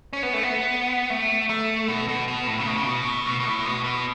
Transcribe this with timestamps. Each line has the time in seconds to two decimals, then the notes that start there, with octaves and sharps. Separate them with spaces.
0.13 C#4
0.23 B3
0.33 A3
0.43 B3
1.10 A3
1.50 A3
1.88 B2
2.09 B2
2.28 B2
2.47 A2
2.60 C#3
2.68 B2
2.77 C#3
2.86 B2
3.06 A2
3.26 B2
3.40 B2
3.45 A2
3.65 B2
3.84 B2